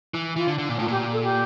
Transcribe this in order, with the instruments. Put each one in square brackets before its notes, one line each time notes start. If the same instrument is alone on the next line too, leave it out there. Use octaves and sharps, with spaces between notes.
[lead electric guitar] E3
[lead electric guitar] E3 [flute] F4
[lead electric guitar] D3
D3
A#2
[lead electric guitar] A2 [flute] F4
[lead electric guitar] A#2 [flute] G4
[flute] A4
G4